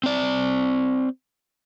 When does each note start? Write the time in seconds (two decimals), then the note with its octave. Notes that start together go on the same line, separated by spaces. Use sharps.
0.04 C4 D5